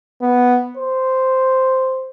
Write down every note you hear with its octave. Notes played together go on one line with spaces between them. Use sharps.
B3
C5